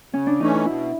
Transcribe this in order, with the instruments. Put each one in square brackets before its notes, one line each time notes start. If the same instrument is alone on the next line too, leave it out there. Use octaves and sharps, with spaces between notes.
[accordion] C#3 [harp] C#4
[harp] D4
[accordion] E3 A3 C#4 [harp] D#4
[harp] E4
[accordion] B2 [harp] E4